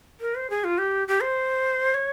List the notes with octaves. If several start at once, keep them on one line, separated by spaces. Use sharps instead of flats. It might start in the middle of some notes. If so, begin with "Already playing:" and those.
A#4
C5
G#4
F4
G4
G4
C5
C#5